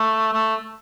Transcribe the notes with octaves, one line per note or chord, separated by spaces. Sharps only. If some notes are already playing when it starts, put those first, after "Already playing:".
Already playing: A3
A3